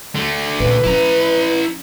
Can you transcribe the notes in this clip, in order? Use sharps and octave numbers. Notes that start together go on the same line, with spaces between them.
D3 A3
C#2 A#2 B4
F3 C#4 E4 A#5